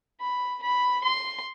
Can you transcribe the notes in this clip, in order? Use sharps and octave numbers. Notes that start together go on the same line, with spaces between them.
B5
B5
C6